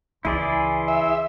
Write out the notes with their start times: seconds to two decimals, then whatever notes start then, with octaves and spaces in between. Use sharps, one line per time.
0.25 C#2 E3 E4 G#4 D5 C6
0.88 E5